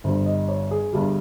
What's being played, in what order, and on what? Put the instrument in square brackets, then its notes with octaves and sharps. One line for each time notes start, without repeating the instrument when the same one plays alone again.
[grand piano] G1 G2 G3 C5
D#5
C#5
G#4
G1 G2 G3